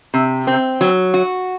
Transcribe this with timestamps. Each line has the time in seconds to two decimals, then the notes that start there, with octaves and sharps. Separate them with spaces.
0.14 C3
0.47 C4
0.81 F#3
1.14 F#4